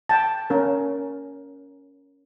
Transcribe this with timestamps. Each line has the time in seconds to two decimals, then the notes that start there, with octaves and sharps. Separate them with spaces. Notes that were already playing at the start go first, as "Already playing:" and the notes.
0.09 G5 A5
0.50 C#4 A#4